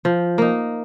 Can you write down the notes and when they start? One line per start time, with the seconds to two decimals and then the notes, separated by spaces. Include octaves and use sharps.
0.05 F3
0.38 A#3 D#4